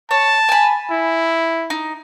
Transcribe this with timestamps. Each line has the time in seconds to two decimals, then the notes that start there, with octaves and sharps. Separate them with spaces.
0.11 C#5 A5
0.49 G#5 B5
0.91 E4
1.70 D#4